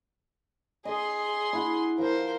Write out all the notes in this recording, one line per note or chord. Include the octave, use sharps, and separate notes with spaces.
G#4 D#5 C6
E4 F#4
F3 A#4 C5